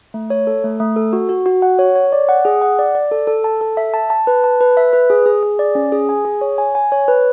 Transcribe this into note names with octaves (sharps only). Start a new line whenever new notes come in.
A3
C#5
A4
A3
A3
A4
F#4
F#4
F#4
F#5
C#5
C#5
D5
F#5
G#4
F#5
D5
D5
A4
A4
A5
A4
E5
A5
A5
B4
A5
B4
E5
B4
G#4
G#4
G#4
D5
C#4
G#4
G#5
G#4
C#5
G#5
G#5
C#5
B4